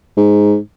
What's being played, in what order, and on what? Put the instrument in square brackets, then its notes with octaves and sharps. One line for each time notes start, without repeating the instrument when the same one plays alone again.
[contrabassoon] G#2